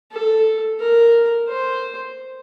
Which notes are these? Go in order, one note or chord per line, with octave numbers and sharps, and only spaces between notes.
A4
A#4
C5